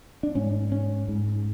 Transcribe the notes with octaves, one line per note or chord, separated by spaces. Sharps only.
D4
G#2 C#4
C#4
G#2